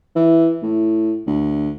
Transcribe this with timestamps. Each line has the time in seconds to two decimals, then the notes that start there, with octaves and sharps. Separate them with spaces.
0.16 E3
0.63 A2
1.27 D2